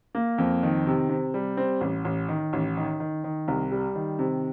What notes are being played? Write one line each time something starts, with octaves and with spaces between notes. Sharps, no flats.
A#3
F2
D#3
C3
C3
G3
C4
A1
A1
D#3
A1
D#3
D#3
D#3
C2
G3
D#3
C3